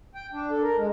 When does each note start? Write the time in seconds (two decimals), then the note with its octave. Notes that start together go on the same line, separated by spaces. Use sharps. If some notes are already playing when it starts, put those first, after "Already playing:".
0.15 G5
0.33 D4
0.51 A4
0.62 A#4
0.77 G#3